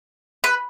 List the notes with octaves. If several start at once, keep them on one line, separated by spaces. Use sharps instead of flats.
B4